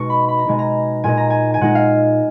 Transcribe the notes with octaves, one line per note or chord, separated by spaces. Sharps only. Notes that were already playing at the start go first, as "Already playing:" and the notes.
Already playing: B2 G#3 D#4 C#6
B5
B5
A#5
B2 G#3 D#4 G#5
A#5
A#2 G#3 D#4 G#5
A#5
G#5
G#5
A#2 G#3 D#4 F#5
F5